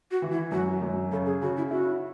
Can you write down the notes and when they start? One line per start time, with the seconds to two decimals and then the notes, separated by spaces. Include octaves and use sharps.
0.11 F#4
0.22 E3
0.32 E4
0.51 F#2 F#4
0.82 F#2
1.12 C#3 A4
1.26 G#4
1.42 C#3 F#4
1.57 E4
1.71 E4 F#4